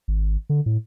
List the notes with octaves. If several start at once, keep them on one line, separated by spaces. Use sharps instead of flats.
G#1
D3
A2